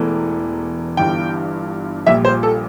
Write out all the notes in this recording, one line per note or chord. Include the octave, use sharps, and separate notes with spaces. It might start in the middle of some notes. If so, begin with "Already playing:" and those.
Already playing: E1 E2 E3 A3
G1 G2 E3 G5
A#1 A#2 G3 E5
C5
A4